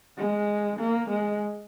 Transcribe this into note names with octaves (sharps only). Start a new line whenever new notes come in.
G#3
A#3
G#3